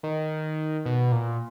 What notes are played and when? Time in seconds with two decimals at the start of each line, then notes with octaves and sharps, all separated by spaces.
0.03 D#3
0.85 B2
1.12 A#2